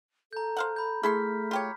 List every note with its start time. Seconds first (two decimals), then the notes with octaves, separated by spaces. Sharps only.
0.33 A4 A#5 G6
0.57 C5 F5 F#5
0.76 B5 G6
1.03 A3 E4 G#4 A4 C6 F6 B6
1.51 F4 G4 C#5